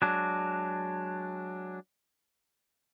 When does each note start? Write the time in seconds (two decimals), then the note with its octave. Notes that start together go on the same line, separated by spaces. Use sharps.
0.02 F#3 G#3 D4